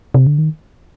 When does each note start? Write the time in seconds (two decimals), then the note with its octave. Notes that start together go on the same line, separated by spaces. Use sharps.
0.14 C3
0.27 D3
0.38 D#3